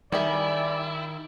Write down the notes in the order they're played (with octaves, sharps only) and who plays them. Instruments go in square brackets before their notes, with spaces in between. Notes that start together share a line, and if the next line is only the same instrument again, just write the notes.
[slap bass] D#3 [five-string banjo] G3 G#4 E5 [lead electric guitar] E4 [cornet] D5